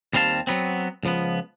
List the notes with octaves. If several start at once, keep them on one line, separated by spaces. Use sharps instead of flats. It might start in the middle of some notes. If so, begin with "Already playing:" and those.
D#2 G3 C4 F5 A5
F#3 B3 C4
C#2 F3 B3